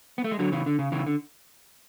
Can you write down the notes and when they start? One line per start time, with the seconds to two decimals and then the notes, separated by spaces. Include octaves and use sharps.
0.18 B3
0.24 A3
0.31 G#3
0.39 D3 F#3
0.52 C#3 E3
0.66 D3
0.79 C#3
0.92 C#3 E3
1.07 D3